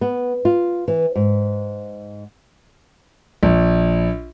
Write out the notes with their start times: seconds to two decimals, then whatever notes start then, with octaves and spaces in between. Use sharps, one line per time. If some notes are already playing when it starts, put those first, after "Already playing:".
0.01 B3
0.45 F4
0.88 E3
1.16 G#2
3.43 A#1